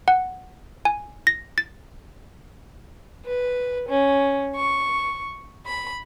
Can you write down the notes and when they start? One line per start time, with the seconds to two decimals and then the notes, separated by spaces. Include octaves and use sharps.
0.08 F#5
0.85 G#5
1.27 A#6
1.58 A6
3.26 B4
3.88 C#4
4.55 C#6
5.66 B5